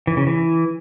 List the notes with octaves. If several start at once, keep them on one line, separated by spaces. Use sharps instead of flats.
E3
C#3
E3